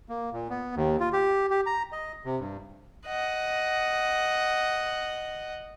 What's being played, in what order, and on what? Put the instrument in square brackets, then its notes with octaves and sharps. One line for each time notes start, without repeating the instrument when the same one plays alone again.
[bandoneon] A#3
A#2
B3
D#2
F4
G4
G4
A#5
D#5
C3
G2
[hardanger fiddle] D#5 F#5